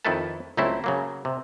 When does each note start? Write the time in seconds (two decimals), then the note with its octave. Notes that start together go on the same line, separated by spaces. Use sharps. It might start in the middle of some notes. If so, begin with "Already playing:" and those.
0.05 F2 D#3 E4 A4 B4 A5
0.57 C#2 F#3 A3 C4 E4 E5
0.84 C#3 F#3 A#3
1.25 C3